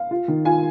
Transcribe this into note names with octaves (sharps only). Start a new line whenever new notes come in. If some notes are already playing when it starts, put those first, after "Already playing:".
Already playing: F5
F4
D#3
F4 G#5